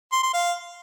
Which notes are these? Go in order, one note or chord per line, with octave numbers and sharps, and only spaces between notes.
C6
C6
F5